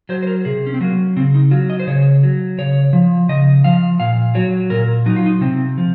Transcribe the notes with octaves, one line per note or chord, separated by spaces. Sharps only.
F#3 C5
C5
A#4
C3 G#4
C#4
C4
F#3 A#3
C#3 C4
D#4
F#3 F4
D#5
C5
C#3 C#5
F#3
C#3 C#5
F3
C#3 D#5
F3 F5
A#2 F5
F#3 C#5
A#2 A#4
F#3 D#4
F4
D#4
C3 C4
F3